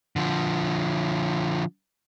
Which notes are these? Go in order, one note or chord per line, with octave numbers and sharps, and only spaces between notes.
D3 F3